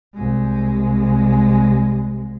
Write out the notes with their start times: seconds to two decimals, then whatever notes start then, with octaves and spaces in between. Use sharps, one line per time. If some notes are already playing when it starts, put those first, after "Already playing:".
0.14 C2 G#3